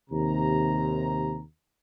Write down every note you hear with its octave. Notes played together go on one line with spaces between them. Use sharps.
D#2 C3 A#5